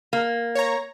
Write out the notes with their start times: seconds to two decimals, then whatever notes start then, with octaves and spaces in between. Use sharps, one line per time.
0.13 A#3
0.55 C#5 A#5